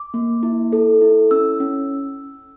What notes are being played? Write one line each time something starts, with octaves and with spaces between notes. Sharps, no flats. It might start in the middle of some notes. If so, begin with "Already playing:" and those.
Already playing: D6
A#3
E4
A4
E4
C#4 E6
C#4